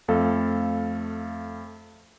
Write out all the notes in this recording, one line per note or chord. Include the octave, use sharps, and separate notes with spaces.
F2 A3 A4 F5